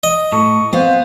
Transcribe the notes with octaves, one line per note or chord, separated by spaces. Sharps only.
D#5
A2 A4 C#6
B3 C4 C5 F5